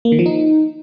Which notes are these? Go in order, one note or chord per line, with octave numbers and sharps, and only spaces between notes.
A#3
D#3
F3
D#4